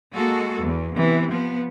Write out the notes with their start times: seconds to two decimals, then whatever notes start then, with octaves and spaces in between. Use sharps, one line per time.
0.13 G#3 A#3 F#4 A4
0.63 E2
0.95 C3 E3 B3
1.29 F3 B3